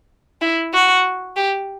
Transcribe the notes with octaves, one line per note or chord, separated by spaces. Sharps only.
E4
F#4
G4